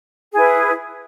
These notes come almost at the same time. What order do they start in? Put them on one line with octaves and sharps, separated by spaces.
G#4 E4 B4